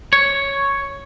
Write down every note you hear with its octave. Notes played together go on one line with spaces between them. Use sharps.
C#5